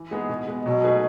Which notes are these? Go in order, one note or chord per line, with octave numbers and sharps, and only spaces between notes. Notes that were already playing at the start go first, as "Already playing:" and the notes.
Already playing: E3
G#3 B3 D#4 G#4
B2
G#3 B3
B2 F#3
A3 D#4 G#4 B4